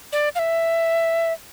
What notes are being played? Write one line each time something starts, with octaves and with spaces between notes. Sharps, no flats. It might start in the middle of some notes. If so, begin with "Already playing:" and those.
D5
F5
E5